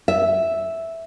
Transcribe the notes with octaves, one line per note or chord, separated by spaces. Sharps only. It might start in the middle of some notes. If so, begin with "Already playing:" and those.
E5